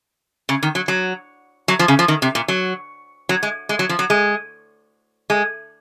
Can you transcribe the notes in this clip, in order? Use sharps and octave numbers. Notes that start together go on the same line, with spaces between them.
C#3
D#3
F#3
F#3
F#3
F3
C#3
F3
D#3
C3
A#2
F#3
F#3
G#3
G#3
F#3
F3
F#3
G#3
G#3